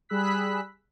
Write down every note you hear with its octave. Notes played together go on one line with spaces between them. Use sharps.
G3 G#4 B5 E6 F#6 B6